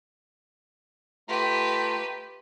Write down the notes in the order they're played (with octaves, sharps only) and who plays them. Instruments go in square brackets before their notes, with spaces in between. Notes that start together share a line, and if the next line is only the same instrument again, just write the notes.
[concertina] A3 F4 A#5 [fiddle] G4 B4